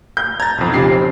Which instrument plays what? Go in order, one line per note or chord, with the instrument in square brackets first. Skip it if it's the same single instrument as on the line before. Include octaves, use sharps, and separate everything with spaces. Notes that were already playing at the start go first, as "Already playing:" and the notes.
[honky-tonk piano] G6
[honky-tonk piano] A#5 [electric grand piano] G#6 A6
[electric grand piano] B1 F2
[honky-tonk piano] C#3 G4 C7
[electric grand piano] C4